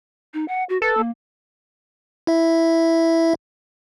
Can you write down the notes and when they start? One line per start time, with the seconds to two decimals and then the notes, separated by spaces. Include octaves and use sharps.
0.34 D#4
0.48 F#5
0.69 F#4
0.82 A4 B4
0.97 A#3
2.27 E4 E5